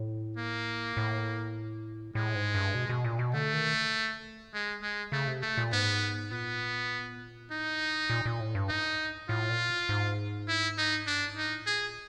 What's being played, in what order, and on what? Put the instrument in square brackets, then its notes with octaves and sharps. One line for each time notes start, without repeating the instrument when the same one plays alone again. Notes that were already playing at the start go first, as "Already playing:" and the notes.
Already playing: [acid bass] A2
[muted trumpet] A#3
[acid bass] A2
[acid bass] A2 [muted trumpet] G#3
[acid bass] G#2
G2
B2
B2
A#2
B2
[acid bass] D3 [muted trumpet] A3
[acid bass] D#3
[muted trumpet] G#3
G#3
[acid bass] C#3 [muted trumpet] A3
[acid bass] C3
[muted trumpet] A3
[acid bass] A#2
[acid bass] G#2 [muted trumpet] B3
[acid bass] A#2 [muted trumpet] B3
[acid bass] A2 [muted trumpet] D#4
[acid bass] A#2
A#2
A2
G2
[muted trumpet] D#4
[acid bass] A2 [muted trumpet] F4
[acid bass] A#2
G#2
[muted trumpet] E4
D#4
[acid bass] G2 [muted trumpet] D4
[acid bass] G#2
[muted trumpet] D#4
[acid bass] A2
[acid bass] A#2 [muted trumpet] G#4